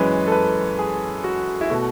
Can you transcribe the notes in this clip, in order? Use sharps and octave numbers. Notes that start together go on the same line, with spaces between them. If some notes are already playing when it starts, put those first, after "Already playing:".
Already playing: F#2 E3 G#3 C#4 B4
A4
B4
G#4
F#4
E4
B2 A3 F#4